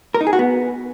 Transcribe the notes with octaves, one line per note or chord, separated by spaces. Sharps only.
A#4
D#4
G#4
F#4
B3